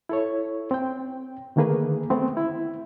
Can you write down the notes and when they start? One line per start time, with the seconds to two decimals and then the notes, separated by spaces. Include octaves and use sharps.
0.09 E4 A4 C#5
0.71 C4 G5
1.56 D3 D#3 A3 A#3 G#4 B4
2.10 A3 B3 C4
2.37 E4